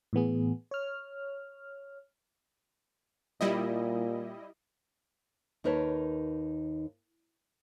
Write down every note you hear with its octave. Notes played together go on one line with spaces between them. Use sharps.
A2 E3 B3 G#4
C#5 F6
A#2 G3 E4 D#5
D#2 D#4 A#4 B4 C#5 A5